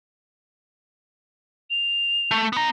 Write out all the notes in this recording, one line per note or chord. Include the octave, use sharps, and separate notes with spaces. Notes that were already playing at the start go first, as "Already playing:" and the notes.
F7
A3
B3 A#5